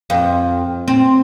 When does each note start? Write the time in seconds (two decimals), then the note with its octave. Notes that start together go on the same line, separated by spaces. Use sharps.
0.10 F2
0.88 C4